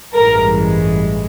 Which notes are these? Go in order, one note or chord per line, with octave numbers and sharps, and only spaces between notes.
A1 G2 E3 G#3 A#4